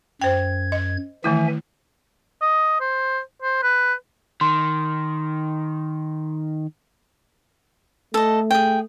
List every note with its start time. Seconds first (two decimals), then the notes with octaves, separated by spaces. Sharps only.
0.21 F#2 C5 G5 G#6
0.72 D#5
1.24 D#3 E3 A3 E4 E5 G#5
2.41 D#5
2.81 C5
3.42 C5
3.63 B4
4.41 D#3 C6
8.14 A3 A4 D#5
8.51 G#4 G5